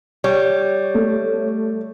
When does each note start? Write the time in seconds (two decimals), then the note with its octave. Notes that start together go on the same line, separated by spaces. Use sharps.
0.24 G3 C#5
0.94 A3